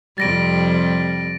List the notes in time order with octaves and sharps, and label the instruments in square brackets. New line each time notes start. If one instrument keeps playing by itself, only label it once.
[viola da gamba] F2 C3 G3 [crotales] A6 A#6 D7